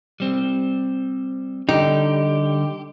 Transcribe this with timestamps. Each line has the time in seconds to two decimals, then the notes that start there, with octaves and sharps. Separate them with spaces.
0.20 G3 C4
1.69 D3 G3 D#4 G4